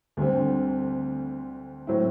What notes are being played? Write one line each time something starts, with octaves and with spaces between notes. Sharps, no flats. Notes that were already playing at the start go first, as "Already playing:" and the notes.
D2 D3 G3 C4
A2 F#3 C4 E4